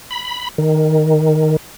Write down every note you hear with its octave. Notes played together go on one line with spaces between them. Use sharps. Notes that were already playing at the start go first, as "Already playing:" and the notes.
B5
D#3